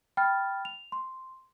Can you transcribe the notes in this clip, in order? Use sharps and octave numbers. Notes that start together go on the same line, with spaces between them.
G5 B5 F6 A6
F7
C6